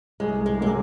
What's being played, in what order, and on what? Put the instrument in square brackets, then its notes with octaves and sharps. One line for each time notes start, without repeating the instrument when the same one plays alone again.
[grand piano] C2 [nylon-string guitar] G#3
[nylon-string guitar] G#3
[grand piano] C3 F#3 A#3 [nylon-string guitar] G#3